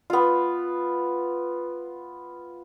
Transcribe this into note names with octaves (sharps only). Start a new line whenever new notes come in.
B3 F4